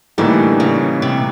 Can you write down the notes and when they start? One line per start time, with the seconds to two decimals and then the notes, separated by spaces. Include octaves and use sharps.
0.18 A2 D3 E3 G3 A#3 D#4
0.60 C#3
1.02 C3